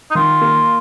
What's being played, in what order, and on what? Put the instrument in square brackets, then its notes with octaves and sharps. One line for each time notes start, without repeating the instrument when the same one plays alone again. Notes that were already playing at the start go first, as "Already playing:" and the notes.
[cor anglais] D#4
[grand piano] D#3 [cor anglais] F4
[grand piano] A#3